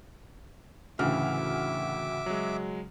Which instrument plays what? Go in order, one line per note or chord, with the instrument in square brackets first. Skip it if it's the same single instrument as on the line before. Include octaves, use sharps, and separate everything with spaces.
[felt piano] D2 A2 E3 [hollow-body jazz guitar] C#3 [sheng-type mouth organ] E5 D6 [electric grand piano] F6
[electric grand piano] F#3 G#3